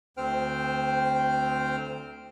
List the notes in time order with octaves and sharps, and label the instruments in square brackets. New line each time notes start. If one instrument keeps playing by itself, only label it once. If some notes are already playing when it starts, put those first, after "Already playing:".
[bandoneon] D2 C4 C5 G5 F6